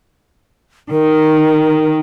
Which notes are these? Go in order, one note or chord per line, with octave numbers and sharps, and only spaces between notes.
D#3 A#4